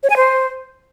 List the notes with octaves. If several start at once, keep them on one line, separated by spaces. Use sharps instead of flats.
C#5
G#5
C5